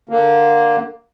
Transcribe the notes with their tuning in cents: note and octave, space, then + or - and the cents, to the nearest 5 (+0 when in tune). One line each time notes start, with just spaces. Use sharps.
D3 +15 A#3 +0